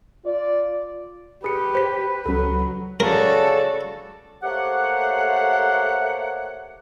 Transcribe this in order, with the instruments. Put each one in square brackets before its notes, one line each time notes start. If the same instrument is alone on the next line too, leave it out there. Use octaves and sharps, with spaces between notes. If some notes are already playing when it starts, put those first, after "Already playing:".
[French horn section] F4 D5
[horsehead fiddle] G4 [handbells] G#4 C#7 [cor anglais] B4
[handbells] C5 B6
[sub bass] C#2 [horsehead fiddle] F#3 [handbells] C#4 A4
[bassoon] C#3 [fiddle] F#4 D5 [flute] A4 [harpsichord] A#4
[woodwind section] A3 A#3 G4 C5 C#5 F#5